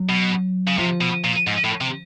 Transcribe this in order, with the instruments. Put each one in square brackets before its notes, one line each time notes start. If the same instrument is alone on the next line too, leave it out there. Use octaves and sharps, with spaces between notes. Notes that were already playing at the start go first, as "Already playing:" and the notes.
Already playing: [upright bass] F#3
[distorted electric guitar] B2
C#3
[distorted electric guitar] C3 [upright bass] F3
[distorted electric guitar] B2
A#2
G#2
A2
C3